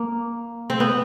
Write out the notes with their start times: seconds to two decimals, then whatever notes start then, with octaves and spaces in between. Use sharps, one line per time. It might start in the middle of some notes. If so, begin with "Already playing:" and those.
Already playing: A#3
0.70 C4
0.80 B3